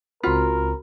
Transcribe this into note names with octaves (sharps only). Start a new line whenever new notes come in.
C#2 C4 F4 F#4 A#4 B5